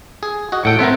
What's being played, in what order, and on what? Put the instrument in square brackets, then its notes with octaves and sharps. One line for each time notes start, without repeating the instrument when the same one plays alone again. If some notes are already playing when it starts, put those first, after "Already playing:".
[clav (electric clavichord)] G#4
F#4 D#5
[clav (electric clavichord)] A2 A4 [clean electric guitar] F#5 G5
[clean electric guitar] B3 C4 A#4 [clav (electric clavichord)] C5 E5 F#5